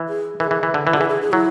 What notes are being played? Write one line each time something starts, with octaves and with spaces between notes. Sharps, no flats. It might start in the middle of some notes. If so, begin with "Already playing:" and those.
Already playing: E3
G#4
E3 A#4
G#4
E3
E3
D3
E3 E4
D3
G#4
E3
G#4
G#4
F#3 E4